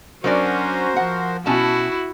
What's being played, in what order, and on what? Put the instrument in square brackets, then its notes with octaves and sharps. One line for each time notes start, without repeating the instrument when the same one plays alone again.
[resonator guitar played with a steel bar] F#3 D4 D5 [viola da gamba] C#4 [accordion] F#4 A#4 C5
[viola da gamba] F3 [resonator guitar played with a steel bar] F#5
[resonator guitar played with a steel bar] B2 C#4 A5 [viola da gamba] E4 F#4